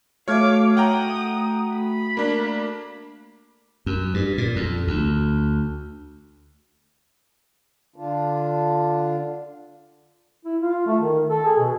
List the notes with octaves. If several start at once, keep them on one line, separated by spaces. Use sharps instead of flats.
A3 F#4 C#5 F5 D6 F6 G#6
F#5 G5 A#5 D#6
B5
A#3 D4
F#2
G2
A#2
F2
D2
D3 D4 F4
E4
F4
A3
D#3
A4
G#4
B2